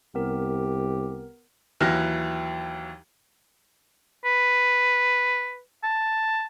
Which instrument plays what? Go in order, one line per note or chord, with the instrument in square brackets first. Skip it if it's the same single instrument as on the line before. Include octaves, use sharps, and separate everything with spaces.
[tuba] C2 [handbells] B3 A#4 [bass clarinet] G4
[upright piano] D#2 E3 F#3 E4 F6 A#6
[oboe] B4
A5